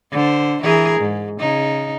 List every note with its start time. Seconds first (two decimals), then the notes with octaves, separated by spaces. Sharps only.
0.12 D3 C5
0.62 E3 G#4 A#4
1.00 G#2
1.39 C#3 D#4